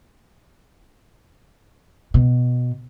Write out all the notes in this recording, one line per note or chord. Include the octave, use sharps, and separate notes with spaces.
B2